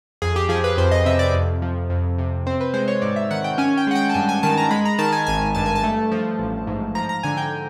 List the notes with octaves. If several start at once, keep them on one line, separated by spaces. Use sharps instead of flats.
F2 G#4
G4
F3 G#4
B4
F2 C5
D#5
C3 E5
D5
F2
F3
F2
C3
C4 C5
B4
G#3 C5
C#5
G#2 D5
E5
D#3 F#5
G5
C#4 G#5
G5
G#3 F#5
G5
A5
G2 G#5
G#5
D#3 A5
A#5
G#3 B5
A#5
D#3 A5
G#5
G#1 G#5
G2 A5
G#5
A5
A3
F3
A1
G#2
F3 A#5
A#5
D3 G#5
G5